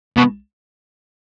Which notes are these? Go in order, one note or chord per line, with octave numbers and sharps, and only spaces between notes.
B2